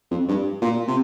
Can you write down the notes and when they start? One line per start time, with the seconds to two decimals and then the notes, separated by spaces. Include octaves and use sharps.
0.11 F2
0.29 G2
0.62 A#2
0.88 C3